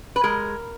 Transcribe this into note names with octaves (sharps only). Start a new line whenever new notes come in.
B4
G#3 A#4